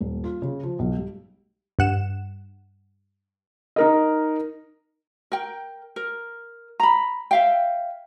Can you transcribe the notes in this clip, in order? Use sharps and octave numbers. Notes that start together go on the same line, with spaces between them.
D#1
F4
C#3
F3
B1
G3
G2 F#5 E7
D#4 A#4 D#5
A#4 G5
A#4
A#5 B5
E5 F5 G5